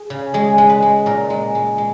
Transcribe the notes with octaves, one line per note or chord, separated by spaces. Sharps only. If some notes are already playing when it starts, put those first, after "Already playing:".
Already playing: G#4
C#3
G#3 G#4
G#3
B4
G#3
A#2 A#4
G#3
G#3
G#3